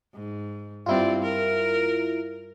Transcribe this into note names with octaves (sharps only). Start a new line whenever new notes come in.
G#2
G2 C4 E4 F4 D5
A#4